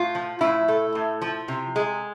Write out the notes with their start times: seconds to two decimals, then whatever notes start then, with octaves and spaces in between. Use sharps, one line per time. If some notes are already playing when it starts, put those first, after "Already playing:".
Already playing: A2 F4
0.15 F3
0.41 A2 E4
0.68 A3
0.95 A2
1.22 F3
1.48 C3
1.76 G#3